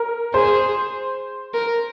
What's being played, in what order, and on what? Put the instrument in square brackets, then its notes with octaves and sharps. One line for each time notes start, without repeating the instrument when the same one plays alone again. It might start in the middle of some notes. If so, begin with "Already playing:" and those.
Already playing: [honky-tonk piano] A#4
[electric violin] G#4 [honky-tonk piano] C5
[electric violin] A#4